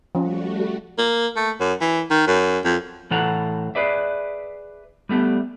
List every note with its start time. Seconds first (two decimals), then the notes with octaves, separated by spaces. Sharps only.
0.15 F3 G3 A3 C#4 F#4
0.98 A#3
1.36 A3
1.60 F#2
1.81 E3
2.11 D#3
2.27 F#2
2.65 F2
3.11 A2 E3 A4 F#5 A#5
3.75 G#4 B4 D5 E5
5.09 G3 A3 B3 G4